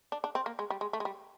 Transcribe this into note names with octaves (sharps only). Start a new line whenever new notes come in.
D4
D4
C4
A#3
G#3
G3
G#3
A3
G#3
G3